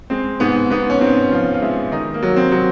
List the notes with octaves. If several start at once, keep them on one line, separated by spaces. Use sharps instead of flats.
G#3 C4
G#2 B3
G#2 B3
C#4
G#2 C4
F3 F4
F4
G#3 E4
D#3 D#4
A#3
F#3
C4
F#3